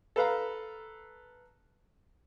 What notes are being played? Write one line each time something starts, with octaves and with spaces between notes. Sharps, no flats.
A4 B4 F5 A#5